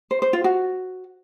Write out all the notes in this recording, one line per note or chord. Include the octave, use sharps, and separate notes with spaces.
C5
C5
F4
F#4